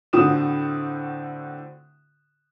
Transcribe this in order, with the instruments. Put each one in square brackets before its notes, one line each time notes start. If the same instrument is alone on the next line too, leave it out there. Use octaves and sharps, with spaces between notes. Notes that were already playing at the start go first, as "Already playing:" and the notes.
[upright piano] A2 D3 C4 F#4 D#6 E7